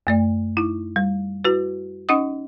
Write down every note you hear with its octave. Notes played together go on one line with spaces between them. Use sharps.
F#2 A3 D5
D#4 E4
G3
E4 F#4 B4
C#4 D#4 D#5 F#5 D#6